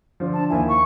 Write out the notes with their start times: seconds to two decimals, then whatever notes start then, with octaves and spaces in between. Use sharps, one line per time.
0.20 D3 F3
0.33 A5
0.50 D#2 E4 G#5
0.68 C#6